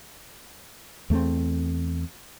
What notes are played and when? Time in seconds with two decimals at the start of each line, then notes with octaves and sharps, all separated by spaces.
1.10 E2 A3 A#3 C4